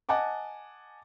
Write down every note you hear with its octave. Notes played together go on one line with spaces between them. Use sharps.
D#5 F#5 G#5 A5 D6